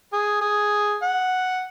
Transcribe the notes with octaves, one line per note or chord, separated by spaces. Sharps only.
G#4
G#4
F#5